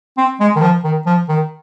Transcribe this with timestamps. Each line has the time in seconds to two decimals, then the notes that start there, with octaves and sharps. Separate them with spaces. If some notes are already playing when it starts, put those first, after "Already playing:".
0.17 C4
0.40 G#3
0.56 D#3
0.62 F3
0.84 D#3
1.06 F3
1.29 D#3